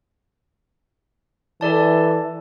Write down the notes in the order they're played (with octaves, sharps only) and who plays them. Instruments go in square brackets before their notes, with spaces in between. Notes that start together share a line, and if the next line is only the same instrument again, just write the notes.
[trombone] E3 [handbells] A4 D5 A5